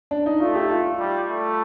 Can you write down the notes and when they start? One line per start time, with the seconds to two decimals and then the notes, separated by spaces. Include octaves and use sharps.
0.11 D4
0.26 D#4
0.40 A3 F4
0.55 G4
0.70 F4
0.85 F4
0.99 G3
1.29 A3